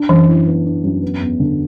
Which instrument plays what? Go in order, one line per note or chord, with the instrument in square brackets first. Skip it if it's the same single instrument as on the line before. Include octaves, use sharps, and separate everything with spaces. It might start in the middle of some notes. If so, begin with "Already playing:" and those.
Already playing: [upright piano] D4
[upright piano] F#2 [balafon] E3
[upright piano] E3
B3
D4
F#2
B3
E2
D3